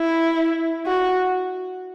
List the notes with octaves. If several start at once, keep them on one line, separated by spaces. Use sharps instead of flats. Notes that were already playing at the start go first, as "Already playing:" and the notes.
Already playing: E4
F#4